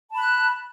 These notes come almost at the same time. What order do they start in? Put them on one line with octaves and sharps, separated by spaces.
A5 B5 F#6